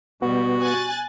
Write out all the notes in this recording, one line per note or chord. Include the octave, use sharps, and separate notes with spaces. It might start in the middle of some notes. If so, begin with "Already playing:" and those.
B2 G3 B3 F#4
G#5 F#6 A6